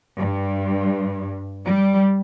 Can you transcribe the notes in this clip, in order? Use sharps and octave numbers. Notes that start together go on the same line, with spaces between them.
G2
G3